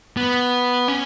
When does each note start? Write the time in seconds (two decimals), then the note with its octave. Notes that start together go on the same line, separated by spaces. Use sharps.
0.17 B3
0.88 C#4